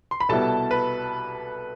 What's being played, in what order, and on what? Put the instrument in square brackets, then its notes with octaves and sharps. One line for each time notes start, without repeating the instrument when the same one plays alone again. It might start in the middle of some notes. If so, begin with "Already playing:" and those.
[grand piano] C6
B5
[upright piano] C2 B2 G3 B3 E4 [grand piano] A4 A5
[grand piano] B4 B5